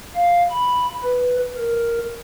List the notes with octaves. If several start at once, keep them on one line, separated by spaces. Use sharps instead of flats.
F5
B5
B4
A#4